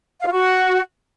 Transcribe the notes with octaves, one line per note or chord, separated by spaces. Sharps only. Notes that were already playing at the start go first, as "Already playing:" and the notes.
F5
F4
F#4